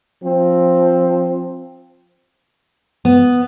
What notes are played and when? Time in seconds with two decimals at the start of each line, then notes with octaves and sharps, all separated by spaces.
0.23 F3 C4
3.05 B3